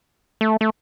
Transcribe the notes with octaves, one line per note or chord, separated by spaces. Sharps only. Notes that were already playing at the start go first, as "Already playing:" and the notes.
A3
A3